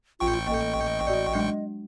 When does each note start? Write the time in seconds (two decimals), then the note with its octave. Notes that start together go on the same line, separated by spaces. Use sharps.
0.20 A1 F4 G5 C#6
0.47 A#3 A4 D#5
1.06 F#4 D5
1.35 F#3 G#3 D4